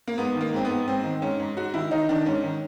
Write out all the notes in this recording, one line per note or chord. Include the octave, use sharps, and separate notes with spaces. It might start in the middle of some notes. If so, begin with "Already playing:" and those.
A#3
G#2 B3
D#3
A#3
G#2 C4
B3
G#2
G#2 C4
D#3
G#2 C#4
G#2
G#2 F#4
D#3 E4
D#3 D#4
D#3 D4
G#2 C#4
D#3